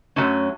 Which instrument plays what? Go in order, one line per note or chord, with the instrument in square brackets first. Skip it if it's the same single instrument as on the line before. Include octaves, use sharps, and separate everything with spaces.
[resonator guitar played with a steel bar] F#2 C#3 F#3 A3 C#4